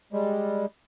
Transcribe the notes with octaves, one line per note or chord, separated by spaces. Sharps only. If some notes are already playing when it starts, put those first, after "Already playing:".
G3 G#3